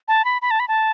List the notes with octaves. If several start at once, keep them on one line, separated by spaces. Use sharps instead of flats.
A5
B5
B5
A5
B5
A5